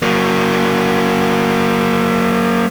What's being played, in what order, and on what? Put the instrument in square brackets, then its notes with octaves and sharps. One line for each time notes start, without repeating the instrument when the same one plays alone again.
[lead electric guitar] F#3 A#3